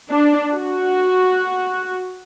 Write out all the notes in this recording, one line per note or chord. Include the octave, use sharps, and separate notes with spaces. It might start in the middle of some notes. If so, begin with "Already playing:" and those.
D4
F#4